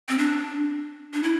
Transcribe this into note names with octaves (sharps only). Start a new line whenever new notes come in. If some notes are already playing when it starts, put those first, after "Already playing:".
C4
D4
D4
E4